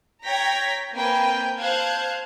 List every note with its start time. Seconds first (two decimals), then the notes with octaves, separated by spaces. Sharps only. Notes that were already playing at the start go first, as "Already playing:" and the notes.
0.25 C#5 G5 A#5 G#6 A#6 B6
0.96 A#3 C4 B4 G5 G#5
1.60 C5 F5 A5 F#6 G#6